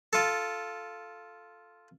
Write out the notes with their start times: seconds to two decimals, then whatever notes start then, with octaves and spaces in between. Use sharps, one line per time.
0.13 F4 A4